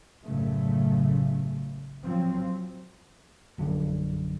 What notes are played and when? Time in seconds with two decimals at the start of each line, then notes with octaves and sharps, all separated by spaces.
0.23 A1 F#2 A#2 C#3 A3
2.04 F3 F#3 C4
3.58 A#1 F#2 D3